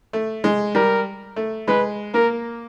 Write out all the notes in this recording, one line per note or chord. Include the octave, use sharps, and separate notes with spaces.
A3
G#3
G3 A#4
A3
G#3 B4
A#3 A#4